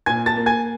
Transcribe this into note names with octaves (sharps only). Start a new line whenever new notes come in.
A#2 G#5 G#6
A5 A6
A#3
G#5 G#6